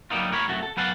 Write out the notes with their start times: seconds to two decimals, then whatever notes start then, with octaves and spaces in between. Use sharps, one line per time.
0.10 F#3 G3 A#3 B3 D#4 F4
0.31 A2 A#4 C#5 B5
0.48 C2 F#2 A3 F#4
0.63 A4
0.77 F#3 B3 B4 F5 F#5 A5